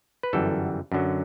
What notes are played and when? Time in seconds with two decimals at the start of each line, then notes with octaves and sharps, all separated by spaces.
0.23 B4
0.33 G1 F#2 E3 G3 A4
0.92 F#2 D3 F#3